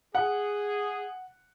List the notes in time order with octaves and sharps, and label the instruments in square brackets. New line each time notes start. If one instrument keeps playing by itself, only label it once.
[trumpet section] G#4 [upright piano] F#5